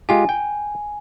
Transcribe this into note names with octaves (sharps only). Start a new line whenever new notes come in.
G#3 F4 G4 G#5
G5